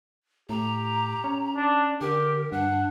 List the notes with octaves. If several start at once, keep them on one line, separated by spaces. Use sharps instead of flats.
A2 G4 A#5
C#4
D4
D3 G4 A#4
G2 D4 F#5